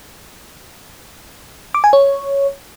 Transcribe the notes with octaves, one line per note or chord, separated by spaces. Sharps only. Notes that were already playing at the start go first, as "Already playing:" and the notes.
D6
G#5
C#5